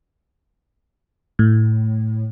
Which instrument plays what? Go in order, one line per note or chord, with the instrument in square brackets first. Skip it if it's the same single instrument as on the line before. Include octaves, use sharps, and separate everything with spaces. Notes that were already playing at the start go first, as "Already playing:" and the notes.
[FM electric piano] A2